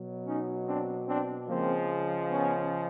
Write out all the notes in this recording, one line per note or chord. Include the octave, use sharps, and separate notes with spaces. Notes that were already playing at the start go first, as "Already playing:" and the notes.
Already playing: B2 F#3
C#4 D#4
C4 D4
C4 D4
C#3 F3 G#3 A#3 C4
B3 C#4